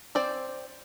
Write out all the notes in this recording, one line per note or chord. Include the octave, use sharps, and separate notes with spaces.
C4 C5 D5